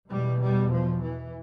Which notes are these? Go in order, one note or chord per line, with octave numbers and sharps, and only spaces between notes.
E2 B2 G3
G3
F3
E3